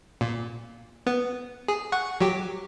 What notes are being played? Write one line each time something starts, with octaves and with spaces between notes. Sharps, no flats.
A#2
B3
G#4
F#5 C#6
F#3 G4